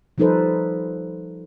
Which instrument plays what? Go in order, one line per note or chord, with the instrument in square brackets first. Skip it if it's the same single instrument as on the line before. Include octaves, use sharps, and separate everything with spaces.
[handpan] F3 G3 D#4 A4 B4 C5